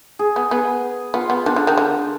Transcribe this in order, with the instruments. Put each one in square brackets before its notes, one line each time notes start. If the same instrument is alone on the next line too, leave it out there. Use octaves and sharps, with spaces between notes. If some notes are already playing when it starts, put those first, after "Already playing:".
[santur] G#4
[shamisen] B3
[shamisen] B3 [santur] G#4
[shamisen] B3 [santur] F4
[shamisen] B3
[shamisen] D#3 [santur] D4
[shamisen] D3
D#3
D3